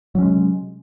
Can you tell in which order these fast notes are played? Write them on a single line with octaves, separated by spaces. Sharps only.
F#3 C#4 G#3 C3